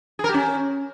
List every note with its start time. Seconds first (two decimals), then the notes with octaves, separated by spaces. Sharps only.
0.19 G#4
0.24 A#4
0.29 G4
0.34 C#4